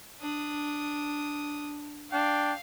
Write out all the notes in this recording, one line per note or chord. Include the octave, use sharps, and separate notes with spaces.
D4 D#6
D4 F5 G5